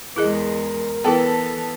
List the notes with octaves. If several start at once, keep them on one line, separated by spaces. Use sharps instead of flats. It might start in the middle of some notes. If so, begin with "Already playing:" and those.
E2 G#3 E4 G#4 A#4 D#5
E3 B3 E4 A4 G5